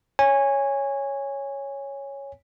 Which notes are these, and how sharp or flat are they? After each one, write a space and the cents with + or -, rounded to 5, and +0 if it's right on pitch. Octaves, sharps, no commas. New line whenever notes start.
C#5 +0 G#5 -15